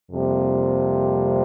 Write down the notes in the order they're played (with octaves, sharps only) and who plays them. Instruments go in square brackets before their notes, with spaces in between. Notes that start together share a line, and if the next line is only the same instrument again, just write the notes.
[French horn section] F2 C3 G3 A#3